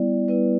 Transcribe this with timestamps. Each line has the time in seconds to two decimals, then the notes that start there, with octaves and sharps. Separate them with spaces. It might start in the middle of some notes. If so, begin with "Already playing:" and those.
Already playing: G3 B3 E4 D5
0.28 G3 B3 E4 B4